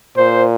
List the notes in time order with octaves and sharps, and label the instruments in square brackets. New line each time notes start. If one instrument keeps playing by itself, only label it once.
[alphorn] A#2 [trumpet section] C5